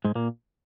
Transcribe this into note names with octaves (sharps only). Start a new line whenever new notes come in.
G#2 G#3
A#2 A#3